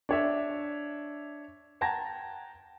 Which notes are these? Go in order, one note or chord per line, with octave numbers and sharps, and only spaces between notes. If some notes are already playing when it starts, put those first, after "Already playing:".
D4 C#5 E5
F#5 G5 A5 A#5 G#6 A#6